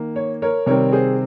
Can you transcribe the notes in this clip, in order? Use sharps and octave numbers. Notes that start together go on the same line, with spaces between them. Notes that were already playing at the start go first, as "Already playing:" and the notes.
Already playing: D#3 A#3
C#5
A#4 C#5
C3 D#3 G3 C4 A#4 C#5
G#4 C5